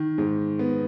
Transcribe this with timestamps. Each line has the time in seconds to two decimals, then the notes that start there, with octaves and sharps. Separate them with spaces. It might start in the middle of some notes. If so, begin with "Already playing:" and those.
Already playing: D#3
0.18 G#2
0.59 B3